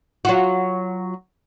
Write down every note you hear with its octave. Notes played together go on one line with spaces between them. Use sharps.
F#3 F4 F#4